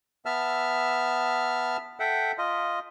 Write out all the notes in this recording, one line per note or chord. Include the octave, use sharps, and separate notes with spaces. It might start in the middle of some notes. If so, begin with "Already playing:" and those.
B3 E5 A5 E6 F6
A4 E5 F#5 G5
F4 D#5